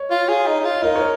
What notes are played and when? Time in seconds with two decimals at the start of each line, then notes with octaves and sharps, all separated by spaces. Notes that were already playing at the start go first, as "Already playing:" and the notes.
Already playing: C#5
0.11 F4
0.29 G#4
0.47 D#4
0.60 D#4
0.65 F4
0.82 D#4 A#4
0.95 C#5